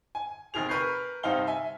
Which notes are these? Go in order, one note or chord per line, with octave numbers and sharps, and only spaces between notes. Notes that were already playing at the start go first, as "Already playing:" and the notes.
G#5
F1 D#3 G#4 F7
A#4 B4 C#6 G6 C7
G2 C3 C4 D#4 F5 G7
E5 G#5